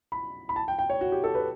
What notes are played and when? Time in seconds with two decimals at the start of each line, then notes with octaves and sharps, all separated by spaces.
0.12 B5
0.49 B5
0.56 A5
0.68 G5
0.79 G5
0.90 C#5
1.01 F#4
1.12 G4
1.24 A4
1.35 B4